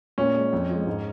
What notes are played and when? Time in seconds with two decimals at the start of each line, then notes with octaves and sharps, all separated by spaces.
0.18 A#2 C#4
0.35 G#3
0.53 F2
0.69 F3 G#3
0.87 G#2